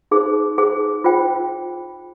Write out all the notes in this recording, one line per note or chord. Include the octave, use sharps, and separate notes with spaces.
D#4 G#4 C5
D#4 G#4 C5
F4 C5 G5